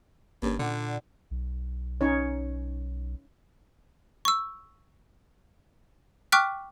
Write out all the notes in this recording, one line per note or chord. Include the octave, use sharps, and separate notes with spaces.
G1 G2 A#3 C#4
A#2 D3 D5 F#5
B1
C#4 D#4 C#5
C#6 E6
G5 C#6 D6 F6 F#6 B6